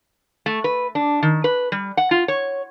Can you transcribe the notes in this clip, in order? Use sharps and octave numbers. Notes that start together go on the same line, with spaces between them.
A3
B4
D4
D#3
B4
G3
F#5
F4
C#5